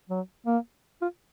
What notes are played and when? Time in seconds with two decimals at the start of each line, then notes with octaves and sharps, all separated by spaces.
0.10 F#3
0.46 A#3
1.01 F4